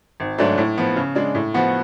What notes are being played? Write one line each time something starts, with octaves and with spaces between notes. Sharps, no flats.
G#1
G#2 F#3 A3 D4
A2
F3 B3
C#3
G#3 D4
A2
F3 B3 F#4